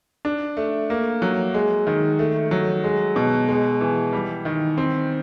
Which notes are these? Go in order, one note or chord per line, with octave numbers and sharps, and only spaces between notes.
D4
A3
A#3
F#3
G#3
D#3
A3
F#3
G#3
B2
G#3
E3
G3
D#3
C4